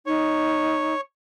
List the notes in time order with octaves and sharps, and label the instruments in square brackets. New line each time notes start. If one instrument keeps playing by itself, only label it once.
[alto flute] D#4 [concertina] C#5